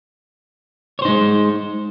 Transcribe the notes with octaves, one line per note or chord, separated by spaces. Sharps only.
G#3 D#4 C5 C#5